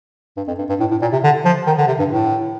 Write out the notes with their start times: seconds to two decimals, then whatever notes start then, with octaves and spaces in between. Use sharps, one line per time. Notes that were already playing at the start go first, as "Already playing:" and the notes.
0.37 G2
0.47 F2
0.58 G2
0.69 G2
0.80 A2
0.91 A2
1.02 A#2
1.13 C3
1.23 D3
1.45 F3
1.67 D#3
1.78 D3
1.87 C3
1.99 G2
2.10 A2